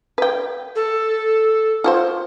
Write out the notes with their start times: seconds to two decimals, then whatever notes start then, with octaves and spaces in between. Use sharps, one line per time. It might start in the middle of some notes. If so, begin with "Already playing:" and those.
0.18 B4 G5
0.76 A4
1.84 F4 F#4 C5